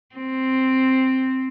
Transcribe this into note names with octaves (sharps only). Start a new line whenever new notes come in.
C4